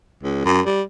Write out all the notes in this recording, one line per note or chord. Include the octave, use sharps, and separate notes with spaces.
C#2
F#2
G3